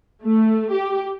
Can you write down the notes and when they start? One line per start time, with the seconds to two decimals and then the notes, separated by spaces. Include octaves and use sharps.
0.23 A3
0.72 G4